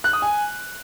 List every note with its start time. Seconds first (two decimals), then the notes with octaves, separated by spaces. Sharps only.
0.04 F#6
0.13 D#6
0.22 G#5